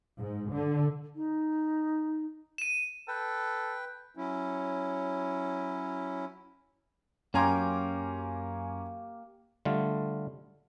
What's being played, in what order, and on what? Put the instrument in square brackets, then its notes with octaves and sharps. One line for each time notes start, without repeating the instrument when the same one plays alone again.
[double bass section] G#2
D3
[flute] D#4
[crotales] D#7 E7
[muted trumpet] A4 [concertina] B4 G5
[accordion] F#3 C#4 E4
[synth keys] F#2 G#5 D6 [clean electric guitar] A#3 G4 [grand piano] C#4 A#5 C6
[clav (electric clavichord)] D3 G3 A3 F4